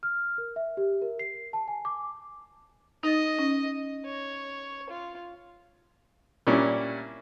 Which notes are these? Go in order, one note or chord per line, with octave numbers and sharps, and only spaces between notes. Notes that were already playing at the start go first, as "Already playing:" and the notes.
F6
A#4
E5
G4
A#4
C7
A5
G#5
D6
D#4 D#5 A6
C#4
C#5
F4
A#2 G3 C#4 D4 E4